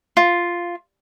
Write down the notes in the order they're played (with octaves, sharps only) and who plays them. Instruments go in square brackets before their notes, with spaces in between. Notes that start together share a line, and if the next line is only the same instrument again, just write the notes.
[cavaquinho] F4